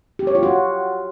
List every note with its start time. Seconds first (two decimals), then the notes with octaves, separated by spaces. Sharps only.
0.19 G4
0.27 C#5
0.35 F4
0.43 F#4